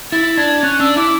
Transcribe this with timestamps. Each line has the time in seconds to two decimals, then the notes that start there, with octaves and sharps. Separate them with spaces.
0.12 E4 A6
0.37 D4 G#6
0.63 C#4 F#6
0.80 D4 E6
0.96 E4 D6